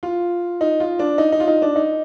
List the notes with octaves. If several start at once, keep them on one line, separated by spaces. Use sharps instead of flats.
F4
D#4
F4
D4
D#4
D#4
F4
D#4
D4
D#4